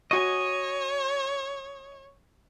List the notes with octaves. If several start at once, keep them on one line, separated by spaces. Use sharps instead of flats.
F#4 C#5 D#5 G#5 C#6